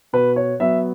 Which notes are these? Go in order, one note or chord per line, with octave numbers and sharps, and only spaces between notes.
B2 B4
C#5
F#3 B3 E5